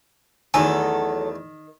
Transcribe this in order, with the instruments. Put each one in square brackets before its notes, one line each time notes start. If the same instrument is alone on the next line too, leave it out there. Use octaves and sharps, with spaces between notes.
[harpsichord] E2 A3 [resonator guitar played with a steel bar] D#3 [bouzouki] F#3 A4 [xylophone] G#5